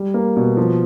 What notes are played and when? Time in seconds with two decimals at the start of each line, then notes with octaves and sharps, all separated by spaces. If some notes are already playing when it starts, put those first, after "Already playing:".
Already playing: G3
0.14 A#3
0.36 B2
0.57 F3